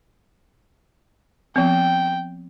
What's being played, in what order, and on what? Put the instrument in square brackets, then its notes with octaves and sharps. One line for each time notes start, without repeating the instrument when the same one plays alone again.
[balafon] F3 B3 C4 [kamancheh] G5